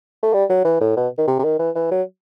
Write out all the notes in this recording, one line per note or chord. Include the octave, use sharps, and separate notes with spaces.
A3
G3
F#3
E3
A2
B2
D#3
C3
C3
D#3
E3
E3
F#3